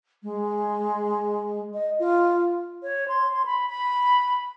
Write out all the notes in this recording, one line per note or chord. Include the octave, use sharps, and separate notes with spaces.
G#3
D#5
F4
C#5
C6
C6
B5
B5